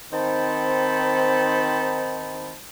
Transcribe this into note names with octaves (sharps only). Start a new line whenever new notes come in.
D#3 C4 D#4 C5 A5 B5